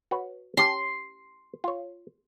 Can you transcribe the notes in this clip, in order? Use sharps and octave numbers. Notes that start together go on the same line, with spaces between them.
F#4 B4 C#5
C#4 G4 A5 C6
F4 C#5